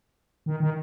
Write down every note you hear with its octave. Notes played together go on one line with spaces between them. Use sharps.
D#3
D#3